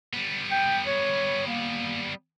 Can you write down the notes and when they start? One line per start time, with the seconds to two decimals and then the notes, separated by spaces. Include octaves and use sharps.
0.13 G3 B3
0.51 G5
0.86 C#5
1.46 A#3